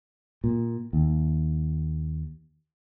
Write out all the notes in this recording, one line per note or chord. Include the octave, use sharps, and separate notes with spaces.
A#2
D#2